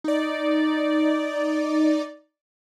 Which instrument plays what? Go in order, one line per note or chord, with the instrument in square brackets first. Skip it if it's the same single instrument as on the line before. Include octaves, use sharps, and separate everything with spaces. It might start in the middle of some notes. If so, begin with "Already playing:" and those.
[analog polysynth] D#4 D5